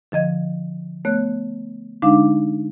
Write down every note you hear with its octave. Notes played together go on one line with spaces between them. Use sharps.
D3 F3 D#5 G#6
A3 B3 C#5 F#6
D3 G#3 D4 D#4 F5 D6